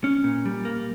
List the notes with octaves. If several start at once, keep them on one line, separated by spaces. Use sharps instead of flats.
C#4
A#2
G3
A#3